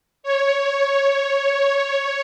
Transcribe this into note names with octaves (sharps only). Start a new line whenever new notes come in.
C#5